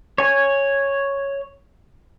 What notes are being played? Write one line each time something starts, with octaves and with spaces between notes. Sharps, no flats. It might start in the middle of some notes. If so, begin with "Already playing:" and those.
C#5 G#5